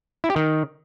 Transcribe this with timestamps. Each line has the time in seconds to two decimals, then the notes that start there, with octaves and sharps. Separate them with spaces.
0.24 E4
0.30 G4
0.36 D#3